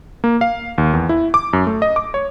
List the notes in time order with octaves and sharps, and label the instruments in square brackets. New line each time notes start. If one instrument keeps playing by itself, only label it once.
[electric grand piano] A#3
F5
D#2
E2
E4
D6
F#2
A3
D#5
D6
C#5